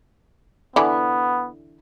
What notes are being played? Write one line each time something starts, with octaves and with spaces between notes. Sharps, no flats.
D3 E3 B3 B5